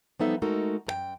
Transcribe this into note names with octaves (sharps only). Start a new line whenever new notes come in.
F3 G3 B3 D#4 A4 E5
G#3 A3 D#4 F#4 A4 A#4
F#2 A#4 G5